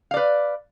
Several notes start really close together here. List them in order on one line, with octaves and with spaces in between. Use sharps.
F5 D5 B4